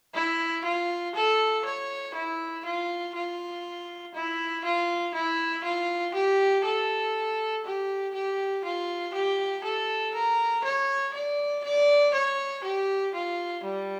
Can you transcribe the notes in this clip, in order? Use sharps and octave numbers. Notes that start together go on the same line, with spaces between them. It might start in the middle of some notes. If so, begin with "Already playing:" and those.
E4
F4
A4
C#5
E4
F4
F4
E4
F4
E4
F4
G4
A4
G4
G4
F4
G4
A4
A#4
C#5
D5
D5
C#5
G4
F4
G3